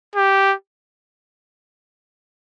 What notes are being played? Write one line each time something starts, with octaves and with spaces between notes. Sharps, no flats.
G4